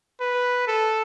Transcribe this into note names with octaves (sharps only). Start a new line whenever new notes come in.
B4
A4